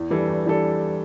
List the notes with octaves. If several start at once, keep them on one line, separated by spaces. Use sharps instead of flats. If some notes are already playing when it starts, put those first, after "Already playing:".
Already playing: E2
E3 G3 D4 A4
E2
E3 G3 D4 A4